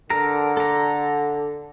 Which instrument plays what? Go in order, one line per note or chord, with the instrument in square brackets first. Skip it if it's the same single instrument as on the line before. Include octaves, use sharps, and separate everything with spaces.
[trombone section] D3 [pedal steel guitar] A4 A#4 A#5
[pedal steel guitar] A4 A#5